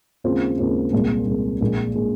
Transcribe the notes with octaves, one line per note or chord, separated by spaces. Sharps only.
D#2 C#3 G#3 C4 F4
D#2 C#3 G#3 C4 F4
C2 A#2 G#3
C2 A#2 G#3
A#1 A#2 G#3
A#2 G#3